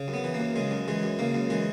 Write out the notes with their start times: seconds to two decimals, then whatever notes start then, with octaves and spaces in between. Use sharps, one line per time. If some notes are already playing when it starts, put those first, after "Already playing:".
Already playing: C#3
0.08 F#2
0.14 B3
0.24 E3
0.34 A#3
0.40 F#2
0.56 C#3 G#3
0.71 F#2
0.88 E3 G#3
1.03 F#2
1.19 C#3 A#3
1.35 F#2
1.50 E3 G#3